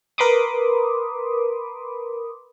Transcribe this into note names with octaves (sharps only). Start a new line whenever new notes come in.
A#4 B4 B5 C6 D6 D#6